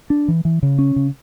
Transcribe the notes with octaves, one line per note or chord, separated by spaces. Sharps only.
D4
E3
E3
C#3
C#4
C#3